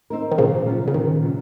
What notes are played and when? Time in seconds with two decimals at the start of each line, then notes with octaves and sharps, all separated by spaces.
0.10 C4 D#4 A#4
0.32 D#3
0.38 A#2 C#3 F3
0.66 F#3 C#4 F4
0.88 C#3
0.94 A#2 D#3
1.22 F#3 C#4 F4